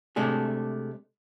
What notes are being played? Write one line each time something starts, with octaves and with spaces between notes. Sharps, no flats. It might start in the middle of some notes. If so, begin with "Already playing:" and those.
C3 G#3 A3 D4 G#4